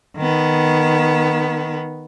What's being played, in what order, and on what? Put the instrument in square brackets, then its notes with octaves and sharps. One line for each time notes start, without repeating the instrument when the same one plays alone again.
[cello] D#3 B3